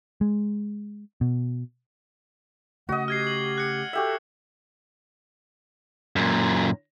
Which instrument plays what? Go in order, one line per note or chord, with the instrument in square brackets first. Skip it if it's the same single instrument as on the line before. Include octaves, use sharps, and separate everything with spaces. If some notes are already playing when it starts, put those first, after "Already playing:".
[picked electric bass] G#3
B2
[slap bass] C#3 A3 [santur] F#4 D#5 [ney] F#5
[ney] G4 [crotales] F6 G#6 C7
[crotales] F#7
F#6 C#7
[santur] F#4 G4 E5 [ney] A4
[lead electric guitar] F#2 A#2